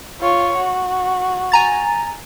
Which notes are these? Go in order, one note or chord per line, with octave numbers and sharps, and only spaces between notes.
F4 C#5
F#4
G#5 A#5 A6